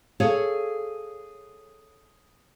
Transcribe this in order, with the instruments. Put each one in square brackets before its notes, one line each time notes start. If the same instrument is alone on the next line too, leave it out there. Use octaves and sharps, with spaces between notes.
[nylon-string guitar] G#4 A4 C#5 F5